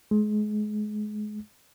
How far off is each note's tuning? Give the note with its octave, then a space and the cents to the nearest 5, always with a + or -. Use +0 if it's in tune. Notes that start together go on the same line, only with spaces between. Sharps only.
G#3 +30